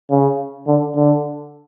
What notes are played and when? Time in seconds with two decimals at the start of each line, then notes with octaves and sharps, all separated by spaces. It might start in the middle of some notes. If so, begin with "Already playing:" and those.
0.10 C#3
0.67 D3
0.95 D3